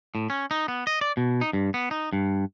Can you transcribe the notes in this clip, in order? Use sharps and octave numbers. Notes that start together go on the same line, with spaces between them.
A2
C#4
D#4
B3
D#5
D5
B2
D#4
G2
B3
D#4
G2